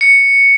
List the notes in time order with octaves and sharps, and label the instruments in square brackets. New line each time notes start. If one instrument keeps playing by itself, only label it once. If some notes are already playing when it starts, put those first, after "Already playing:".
[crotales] C#7